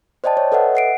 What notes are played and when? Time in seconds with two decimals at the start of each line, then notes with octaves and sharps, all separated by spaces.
0.24 C5 D5 D#5 G5 A5
0.37 C#5
0.52 A4 B4 D#5 E5 F#5
0.75 F#5 C7 D7